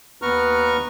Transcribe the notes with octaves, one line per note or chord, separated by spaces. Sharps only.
D#2 B3 B4 A#5 C#6 F6